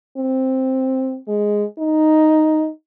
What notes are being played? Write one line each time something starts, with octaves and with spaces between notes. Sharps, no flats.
C4
G#3
D#4